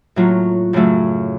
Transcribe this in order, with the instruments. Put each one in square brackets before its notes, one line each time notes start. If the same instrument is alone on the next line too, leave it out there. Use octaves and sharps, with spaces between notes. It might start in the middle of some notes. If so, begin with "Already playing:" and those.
[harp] A2 F#3 A#3 F4
F#2 C#3 F#3 A3